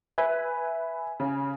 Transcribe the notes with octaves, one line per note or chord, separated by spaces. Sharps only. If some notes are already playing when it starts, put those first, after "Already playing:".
B4 E5 G#5 B5
C#3 G#5